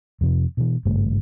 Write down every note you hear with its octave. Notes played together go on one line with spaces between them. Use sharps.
F2 C3 D#3 F3
B2 E3
G#1 G2 C#3 A3